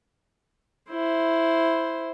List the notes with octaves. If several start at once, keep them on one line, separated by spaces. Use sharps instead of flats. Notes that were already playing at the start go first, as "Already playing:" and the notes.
E4 C5